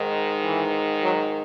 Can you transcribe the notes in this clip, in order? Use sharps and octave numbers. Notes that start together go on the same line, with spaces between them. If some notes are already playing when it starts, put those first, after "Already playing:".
Already playing: G#2 D#3
E3
F#3